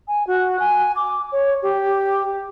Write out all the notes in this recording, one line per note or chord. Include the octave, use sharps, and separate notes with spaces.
G#5
F#4
G#5
D6
C#5
G4